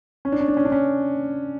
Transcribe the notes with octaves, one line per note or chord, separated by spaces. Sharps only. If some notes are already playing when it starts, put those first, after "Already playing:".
C#4
D4
C#4
D4
C#4
D4
C#4